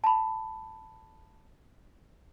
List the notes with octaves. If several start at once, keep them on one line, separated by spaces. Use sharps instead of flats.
A5 B5